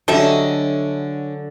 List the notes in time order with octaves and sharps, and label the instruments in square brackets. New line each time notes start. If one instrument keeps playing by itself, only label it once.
[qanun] D3 F#3 D#5 [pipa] G3 A4 E5 [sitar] C#4 D4